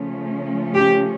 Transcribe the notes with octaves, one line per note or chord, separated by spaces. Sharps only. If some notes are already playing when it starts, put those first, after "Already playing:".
Already playing: C#3 F3 A3 C#4
G4